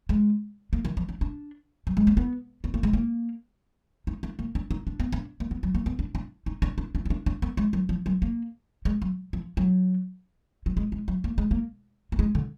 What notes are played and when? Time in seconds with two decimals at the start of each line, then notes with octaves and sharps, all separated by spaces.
0.09 G#3
0.73 A#3
0.85 D#3
0.97 F3
1.09 D4
1.21 D4
1.87 F#3
1.97 G#3
2.07 A#3
2.17 B3
2.64 B3
2.74 A#3
2.83 G#3
2.93 A#3
4.07 D#4
4.23 D4
4.39 A#3
4.55 D4
4.71 D#4
4.87 D4
5.00 B3
5.12 D4
5.40 A#3
5.51 B3
5.63 F#3
5.75 A#3
5.86 B3
5.99 D4
6.15 D4
6.46 D#4
6.62 D4
6.78 D4
6.95 D4
7.05 D#4
7.10 D4
7.26 D4
7.42 B3
7.57 G#3
7.73 F#3
7.89 F3
8.06 F#3
8.22 A#3
8.85 G#3
9.02 F#3
9.33 F3
9.57 F#3
10.66 F#3
10.77 G#3
10.92 G#3
11.08 F#3
11.24 A#3
11.38 G#3
11.51 A#3
12.12 A#3
12.19 G#3
12.35 D3